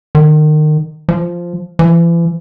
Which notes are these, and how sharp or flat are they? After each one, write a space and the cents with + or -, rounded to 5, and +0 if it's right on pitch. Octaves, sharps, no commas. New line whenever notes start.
D#3 -30
F3 -5
E3 +40